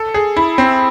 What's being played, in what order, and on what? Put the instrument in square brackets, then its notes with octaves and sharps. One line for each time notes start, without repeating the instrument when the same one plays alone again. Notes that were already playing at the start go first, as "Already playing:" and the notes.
Already playing: [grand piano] A4
G#4
E4
C4